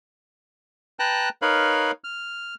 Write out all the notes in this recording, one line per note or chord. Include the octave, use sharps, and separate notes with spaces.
B4 G5 A5 A#5 F#6
D#4 A#4 B4 C#5 F5 B5
F6